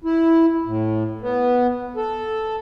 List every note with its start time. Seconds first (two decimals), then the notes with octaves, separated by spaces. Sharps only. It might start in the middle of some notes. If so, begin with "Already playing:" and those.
0.04 E4
0.65 A2
1.21 B3
1.96 A4